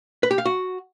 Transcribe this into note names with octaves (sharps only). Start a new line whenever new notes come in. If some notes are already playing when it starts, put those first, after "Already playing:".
B4
G4
F5
F#4